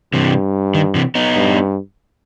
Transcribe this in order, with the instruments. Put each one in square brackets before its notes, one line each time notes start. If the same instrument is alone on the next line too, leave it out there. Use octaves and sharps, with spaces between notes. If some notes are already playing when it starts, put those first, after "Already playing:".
[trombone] G2 [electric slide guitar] C3 E3
[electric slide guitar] D#3
C3 E3
B3 D#4
[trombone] G2